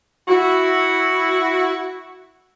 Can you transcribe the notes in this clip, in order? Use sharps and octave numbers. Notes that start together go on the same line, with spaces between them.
E4 F#4